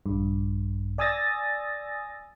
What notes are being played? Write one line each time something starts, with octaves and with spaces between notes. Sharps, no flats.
A#1 G2
D5 G#5 D#6 E6 A6 A#6